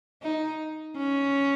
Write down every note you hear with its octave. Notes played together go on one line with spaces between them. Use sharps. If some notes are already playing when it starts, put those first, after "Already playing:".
D#4
C#4